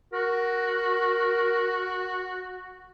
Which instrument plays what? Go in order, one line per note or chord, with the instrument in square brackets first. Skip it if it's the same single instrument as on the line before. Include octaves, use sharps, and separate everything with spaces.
[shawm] F#4 [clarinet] A#4